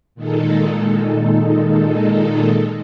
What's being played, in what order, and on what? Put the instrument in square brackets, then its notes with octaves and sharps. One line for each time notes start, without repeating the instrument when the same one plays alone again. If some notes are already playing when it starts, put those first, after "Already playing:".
[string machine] A#2 D#3 G#3 D#4 A4